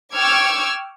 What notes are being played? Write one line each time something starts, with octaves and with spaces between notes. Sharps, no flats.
G5 C#6 D6 E6 F6 G#6